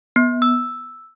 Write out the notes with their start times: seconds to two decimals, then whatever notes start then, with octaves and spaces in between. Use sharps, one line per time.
0.16 B3
0.42 E6